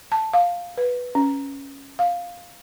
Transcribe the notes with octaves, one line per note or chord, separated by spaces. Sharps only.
A5
F5
B4
C#4
F5